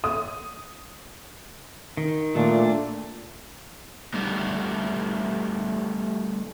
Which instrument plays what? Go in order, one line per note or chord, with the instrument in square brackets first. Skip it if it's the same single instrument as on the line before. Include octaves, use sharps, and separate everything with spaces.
[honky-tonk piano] D#6
[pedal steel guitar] D#3
[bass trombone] A#2 [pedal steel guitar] A3 D4
[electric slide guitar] G3 A3 B3 D#4